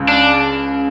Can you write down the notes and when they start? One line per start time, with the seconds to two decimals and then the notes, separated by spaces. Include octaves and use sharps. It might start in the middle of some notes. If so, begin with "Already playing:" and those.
Already playing: C#2 C#3
0.09 D4